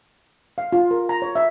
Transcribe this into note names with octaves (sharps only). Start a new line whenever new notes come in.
F5
F4
A#4
A#5
C#5
E5